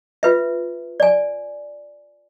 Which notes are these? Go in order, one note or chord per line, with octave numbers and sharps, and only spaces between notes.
F4 B4 E5
D5 G#5